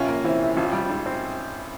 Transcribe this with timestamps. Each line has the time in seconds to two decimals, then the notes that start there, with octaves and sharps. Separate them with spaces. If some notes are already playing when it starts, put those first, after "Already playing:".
Already playing: A#1 C3 C#4 F4
0.08 A#3
0.24 E3 C4 E4
0.41 C3
0.57 G#1 C#4 F4
0.73 G3
0.89 G#2
1.06 C4